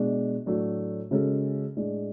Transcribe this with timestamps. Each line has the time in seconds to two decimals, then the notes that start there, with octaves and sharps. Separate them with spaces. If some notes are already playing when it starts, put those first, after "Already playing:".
Already playing: B2 G#3 D4
0.46 A2 F#3 A3 D4
1.11 C#3 G#3 C#4 F#4 A4
1.77 A2 G#3 D4